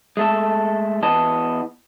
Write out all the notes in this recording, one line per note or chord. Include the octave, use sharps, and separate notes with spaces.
G#3 A3 A4
E2 E3 B3 D#5 A5